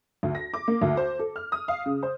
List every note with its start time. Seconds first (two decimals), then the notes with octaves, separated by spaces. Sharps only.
0.23 D2
0.35 A#6
0.54 D6
0.68 A#3
0.82 D2
0.97 C5
1.19 A4
1.36 F6
1.52 D#6
1.68 F5
1.86 C#3
2.03 C5